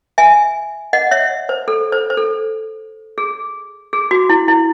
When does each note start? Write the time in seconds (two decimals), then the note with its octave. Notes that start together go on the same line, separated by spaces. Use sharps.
0.18 E5 G#5
0.93 D#5 F#5
1.11 C#5 E5
1.49 C5
1.68 A4
1.92 C5
2.10 C5
2.17 A4
3.18 G#4
3.93 G#4
4.11 F#4
4.29 E4
4.48 E4